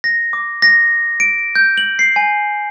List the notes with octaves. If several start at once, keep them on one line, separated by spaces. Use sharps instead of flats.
A#6
D6
A#6
D7
G6
F#7
C7
G#5